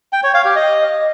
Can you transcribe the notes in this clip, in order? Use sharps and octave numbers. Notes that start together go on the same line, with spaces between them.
G5
C#5
F5
G4
D#5